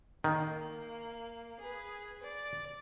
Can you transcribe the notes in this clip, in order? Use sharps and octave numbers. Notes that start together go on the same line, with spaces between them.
D#3 A#3
G#4 B4
D5